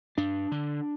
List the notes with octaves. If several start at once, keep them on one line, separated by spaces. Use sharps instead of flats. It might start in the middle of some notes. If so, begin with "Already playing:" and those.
G2 D4
D3